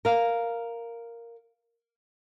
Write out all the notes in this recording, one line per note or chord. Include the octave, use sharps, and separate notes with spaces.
A#4 F5